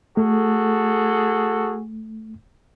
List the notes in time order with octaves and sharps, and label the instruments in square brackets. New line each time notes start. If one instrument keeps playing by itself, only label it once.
[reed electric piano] A3 [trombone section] F#4 G#4 A4